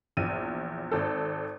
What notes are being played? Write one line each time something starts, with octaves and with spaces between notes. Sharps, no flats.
A#1 E2 D#7
G#1 A4